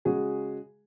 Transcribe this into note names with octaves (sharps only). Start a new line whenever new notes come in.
C#3 G#3 F#4 G#4